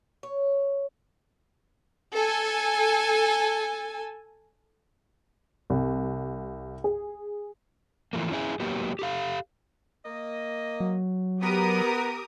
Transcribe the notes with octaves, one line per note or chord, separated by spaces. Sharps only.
C#5
A4 G#5
C2
G#4
E3 F3 A3 A#3
C#4 E4 G#4
F#3 A#3 B3 G4
G4 A4 F5
A#3 D#5
F#3
B3 G4 A#4 D#6